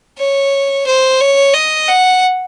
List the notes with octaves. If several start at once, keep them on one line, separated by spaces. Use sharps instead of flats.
C#5
C5
C#5
D#5
F#5